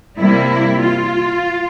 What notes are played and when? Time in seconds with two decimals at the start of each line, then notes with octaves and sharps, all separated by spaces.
0.19 C3 G3 A#3 E4
0.83 F4